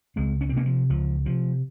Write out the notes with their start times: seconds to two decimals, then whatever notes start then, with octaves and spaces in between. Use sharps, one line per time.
0.16 C#2 G#3 C4
0.41 C#4
0.49 C4
0.53 C3 A#3 C#4
0.66 F3
0.89 C#2 F3
1.25 C3 F3